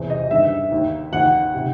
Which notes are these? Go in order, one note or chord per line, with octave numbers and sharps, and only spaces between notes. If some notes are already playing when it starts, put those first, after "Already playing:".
Already playing: E2 C3 E3 C5
D#5
G2 D#3 E5
D#2 D#3
D#2 D#3 F#5
C3 D#3